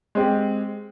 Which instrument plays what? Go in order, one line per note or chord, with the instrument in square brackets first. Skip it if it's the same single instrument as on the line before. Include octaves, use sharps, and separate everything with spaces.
[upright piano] G#3 C4 G4